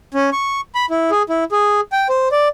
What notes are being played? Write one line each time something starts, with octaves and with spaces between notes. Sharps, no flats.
C#4
C#6
B5
E4
G#4
E4
G#4
G5
C5
D5